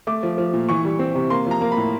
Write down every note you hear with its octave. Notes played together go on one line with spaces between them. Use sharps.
A3 D6
F3
F3
A#2
E3 C#6
G3
C4
C3
A#3 C6
F3 A#5
A#3
B5
A2